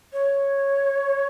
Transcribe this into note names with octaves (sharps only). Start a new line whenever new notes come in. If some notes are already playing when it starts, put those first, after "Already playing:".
C#5